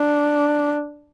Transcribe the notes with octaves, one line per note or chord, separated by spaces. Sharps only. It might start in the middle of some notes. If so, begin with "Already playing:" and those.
Already playing: D4